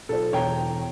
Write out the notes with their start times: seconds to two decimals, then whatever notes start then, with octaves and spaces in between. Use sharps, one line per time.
0.09 B1 F4 A4 C5
0.33 E1 B2 E3 C#5 G5 A#5